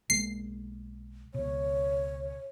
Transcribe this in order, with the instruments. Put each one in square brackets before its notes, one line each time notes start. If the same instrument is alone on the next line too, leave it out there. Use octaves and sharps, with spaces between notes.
[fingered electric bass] B1 G#3 A#3 [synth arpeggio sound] C7
[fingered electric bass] C#2 B2 [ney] C#5